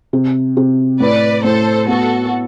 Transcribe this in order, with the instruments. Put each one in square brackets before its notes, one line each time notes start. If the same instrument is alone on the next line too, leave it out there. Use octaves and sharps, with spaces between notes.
[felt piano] C3
C3
[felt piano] A2 [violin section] B4 D5
[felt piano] A2 [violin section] A4 C5
[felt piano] B3 [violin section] F#4 A4